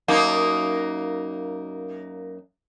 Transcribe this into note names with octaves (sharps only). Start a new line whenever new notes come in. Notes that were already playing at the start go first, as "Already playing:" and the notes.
F#2 A#3 D#4